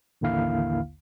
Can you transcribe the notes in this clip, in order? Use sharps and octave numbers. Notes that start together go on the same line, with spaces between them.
A1 D#2 D3 A#3 E4 F5